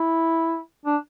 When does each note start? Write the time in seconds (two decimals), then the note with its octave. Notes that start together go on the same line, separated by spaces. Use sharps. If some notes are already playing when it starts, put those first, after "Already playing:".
Already playing: E4
0.86 D4